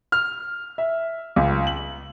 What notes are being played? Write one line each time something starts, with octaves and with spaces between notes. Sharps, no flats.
F6
E5
C#2
F#7